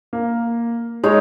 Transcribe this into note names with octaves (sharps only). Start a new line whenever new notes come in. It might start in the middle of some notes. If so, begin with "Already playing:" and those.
A#3
G#3 D#4 C#5